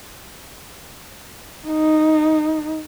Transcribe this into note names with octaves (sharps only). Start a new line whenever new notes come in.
D#4